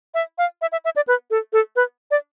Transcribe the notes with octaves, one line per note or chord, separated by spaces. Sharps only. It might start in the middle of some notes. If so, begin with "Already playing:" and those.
E5
F5
E5
E5
E5
D5
B4
A4
A4
B4
D5